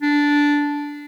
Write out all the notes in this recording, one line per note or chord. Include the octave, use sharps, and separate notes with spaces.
D4